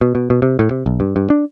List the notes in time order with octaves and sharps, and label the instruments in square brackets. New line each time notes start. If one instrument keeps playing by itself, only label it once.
[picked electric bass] B2
B2
B2
C3
A2
C3
B1
G2
G2
D4